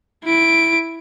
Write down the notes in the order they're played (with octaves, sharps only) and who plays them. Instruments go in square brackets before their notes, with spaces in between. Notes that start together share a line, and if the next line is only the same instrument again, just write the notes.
[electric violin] E4 D7